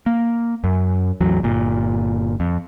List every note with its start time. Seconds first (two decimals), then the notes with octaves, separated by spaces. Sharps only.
0.06 A#3
0.64 F#2
1.21 A1 E2 F#3
1.43 G1 A#2
2.40 F2